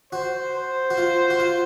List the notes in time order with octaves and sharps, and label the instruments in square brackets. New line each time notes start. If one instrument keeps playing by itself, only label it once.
[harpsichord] F#4 [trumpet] C5
[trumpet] C5
[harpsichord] F#4
F4
F#4
F4